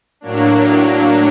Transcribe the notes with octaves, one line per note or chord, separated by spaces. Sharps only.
A2 F#3 A#3 D4